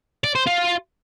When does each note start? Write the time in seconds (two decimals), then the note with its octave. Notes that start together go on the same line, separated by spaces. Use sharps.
0.24 D5
0.35 C5
0.47 F4